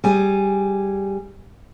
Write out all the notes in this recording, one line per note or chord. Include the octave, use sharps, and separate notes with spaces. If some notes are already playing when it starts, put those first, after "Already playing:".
G3 G#4 G#5